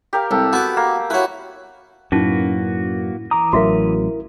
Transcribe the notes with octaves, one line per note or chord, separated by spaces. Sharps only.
G4 A#4 F5
C2 A4
B3 F#4 D6
A#3
E4 F#4 B4 C#5
F#2 A2 A#3 C#4 D#4 E4 F#4 B4
E3 A#5 D6 D#6
A1 F#3 E4 F#4 A#4 E5 F5